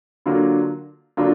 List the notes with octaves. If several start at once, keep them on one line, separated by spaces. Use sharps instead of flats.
D3 F#3 A#3 D4 F4
D3 F#3 A#3 D4 F4